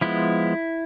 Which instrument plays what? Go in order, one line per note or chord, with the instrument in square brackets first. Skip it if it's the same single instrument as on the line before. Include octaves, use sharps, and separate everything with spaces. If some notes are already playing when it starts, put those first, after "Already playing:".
[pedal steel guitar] F3 G#3 B3 E4